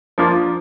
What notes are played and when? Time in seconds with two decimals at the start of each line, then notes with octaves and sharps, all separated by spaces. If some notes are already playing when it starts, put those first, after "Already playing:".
0.18 F3 A#3 D4 F4